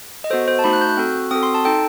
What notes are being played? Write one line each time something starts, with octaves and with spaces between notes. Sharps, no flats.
D#5
B3 F#4 A4 C5
C5
A5
A3 D#4 F#4 B5
F#6
G6
F#6
C4 F#4 A4
C4 F#4 A4 D#6
C6
A5
D#4 A4 G5